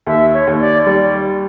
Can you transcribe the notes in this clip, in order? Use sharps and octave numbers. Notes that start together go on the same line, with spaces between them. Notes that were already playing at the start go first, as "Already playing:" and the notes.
D#2 E5
C#5
D#2
D5
G3 D5